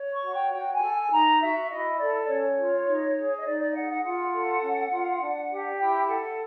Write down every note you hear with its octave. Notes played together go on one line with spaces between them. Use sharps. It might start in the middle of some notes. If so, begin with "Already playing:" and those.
Already playing: C#5
C#6
F#4
G5
F#4 G5
G#5
A4
G#5
D#4 A#5
F#4 E5
E4 D#5
A4 D5
C#4 C#5
F4
D#4
G#4
D#5
D#4 D5
D5
G#4 F#5
F#5
F4 F#5
A4
C#4
F4
D4
G4
E4 G5
A4 F#5